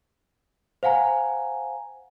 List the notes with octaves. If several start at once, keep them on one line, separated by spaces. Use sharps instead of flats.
C5 F5 F#5 G#5 A#5